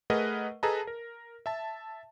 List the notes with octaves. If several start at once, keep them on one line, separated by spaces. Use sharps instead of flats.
A3 G#4 A#4 B4 D#5 F#5
G#4 A4 B4 D#5 A5 A#5
A#4
E5 A5